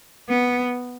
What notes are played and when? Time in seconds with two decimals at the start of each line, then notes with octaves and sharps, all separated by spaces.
0.29 B3